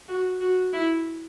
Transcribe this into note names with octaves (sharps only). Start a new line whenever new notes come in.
F#4
F#4
E4